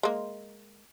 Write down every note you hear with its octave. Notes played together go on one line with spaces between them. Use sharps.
G#3 A#3